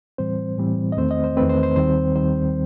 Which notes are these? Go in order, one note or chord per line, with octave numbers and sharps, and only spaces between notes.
A2 E3 G3 C4 C5
A2 E3 G3 C4
D#5
E2 D#3 A3 C4 C5
D#5
C5
E2 D#3 A3 C4 B4
C5
C5
D#2 D#3 G3 C4 C5
D#2 D#3 G3 C4 C5